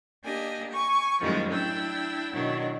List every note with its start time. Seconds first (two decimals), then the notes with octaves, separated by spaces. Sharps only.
0.25 A#3 D4 G4 D#5 G#5
0.71 G#5 C#6
1.20 F#2 A2 D#3 F3 G3 G#3
1.51 D4 E4 G5 E6
2.33 B2 D#3 F#3 D4 E4